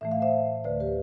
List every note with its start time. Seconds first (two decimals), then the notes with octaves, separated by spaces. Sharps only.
0.01 A2 E3 A3 E5
0.12 F5
0.22 C5 E5
0.64 D2 D3 A3 B4 D5
0.80 G4 B4